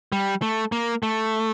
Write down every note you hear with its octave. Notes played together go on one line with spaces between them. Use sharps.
G3
A3
A#3
A3